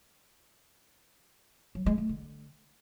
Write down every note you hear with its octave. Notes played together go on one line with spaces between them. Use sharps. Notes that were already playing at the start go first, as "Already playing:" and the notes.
F#3
G#3
A3
D3